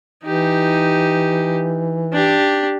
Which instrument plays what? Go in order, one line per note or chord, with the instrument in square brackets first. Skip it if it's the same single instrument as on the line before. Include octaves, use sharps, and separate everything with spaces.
[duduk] E3 [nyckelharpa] D#4 G4
[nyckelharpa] D4 G4